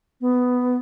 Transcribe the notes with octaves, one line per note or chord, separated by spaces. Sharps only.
B3